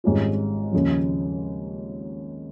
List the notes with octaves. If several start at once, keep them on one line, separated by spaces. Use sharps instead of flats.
G#1 G#2 G3 C#4 F4
D#2 C#3 F3